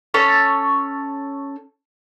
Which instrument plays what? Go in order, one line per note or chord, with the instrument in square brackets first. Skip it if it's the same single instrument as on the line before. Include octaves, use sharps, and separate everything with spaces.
[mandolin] C#4 A4 C#5